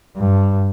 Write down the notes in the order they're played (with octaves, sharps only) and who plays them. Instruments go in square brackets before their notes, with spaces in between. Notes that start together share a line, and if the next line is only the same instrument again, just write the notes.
[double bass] G2